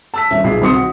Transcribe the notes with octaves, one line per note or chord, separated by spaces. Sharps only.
A5 E6 B6
D#1 C#4 E5
B1 A#2 G#4 C7
B1 D#3 C4 C6 D#6 C#7
F#4